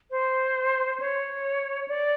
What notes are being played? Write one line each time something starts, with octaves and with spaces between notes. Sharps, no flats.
C5
C#5
D5